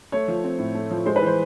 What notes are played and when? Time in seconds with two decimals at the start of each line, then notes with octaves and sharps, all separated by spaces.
0.12 A3 C#5
0.28 F3
0.44 C4
0.59 A2
0.75 A3
0.91 F3
1.06 G#3 C5
1.16 B4
1.22 E3 C5